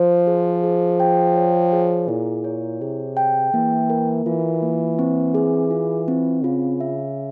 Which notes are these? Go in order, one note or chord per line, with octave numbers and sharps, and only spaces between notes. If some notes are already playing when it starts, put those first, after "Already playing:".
Already playing: F3 C5
G#4
G#4
G5
C#5
G#4
A#2 E4
C#5
C3 G#4
G5
E3 A#3
A#4
E3 F4
A#3
C4
G#4
F4
C4
C#3 F4
E5